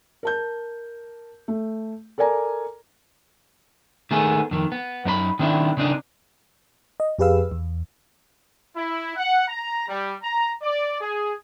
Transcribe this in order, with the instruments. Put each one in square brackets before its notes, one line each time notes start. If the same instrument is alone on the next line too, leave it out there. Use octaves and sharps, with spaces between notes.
[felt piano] A#4 A5 G6
A3
A4 A#4 D5 G#5 A#5
[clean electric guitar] D#3 A3 B3 G#4
F2 D#3
B3
F#2 D#4 A#4 B5
D#3 C4 D4 E4
C#3 C4 D4 D#4
[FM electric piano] D#5
F2 G4 G#4 B4 F5 E6
E2
[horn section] E4
F#5
A#5
G3
A#5
D5
G#4